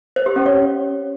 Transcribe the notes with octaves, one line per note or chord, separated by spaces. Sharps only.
C5
G4
C#4
C#5